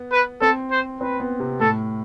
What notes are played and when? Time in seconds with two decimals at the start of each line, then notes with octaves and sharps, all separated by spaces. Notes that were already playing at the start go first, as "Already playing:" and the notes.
Already playing: B3
0.12 B4
0.41 C4 A4
0.71 C5
1.01 C4 B4
1.20 B3
1.40 C3
1.60 A2 A4